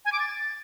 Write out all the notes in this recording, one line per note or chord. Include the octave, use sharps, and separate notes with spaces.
G#5
D6
A6